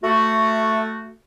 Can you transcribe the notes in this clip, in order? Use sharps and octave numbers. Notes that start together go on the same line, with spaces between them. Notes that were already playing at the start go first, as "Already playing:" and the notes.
A3 F#4